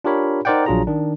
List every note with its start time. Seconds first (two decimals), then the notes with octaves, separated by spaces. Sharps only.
0.04 D4 F4 G4 A#4 C#5 B5
0.45 D#4 A#4 C5 D5 F#5 G5
0.66 A#1 F#3 D4 F4 G#4 A#5
0.87 D#3 D4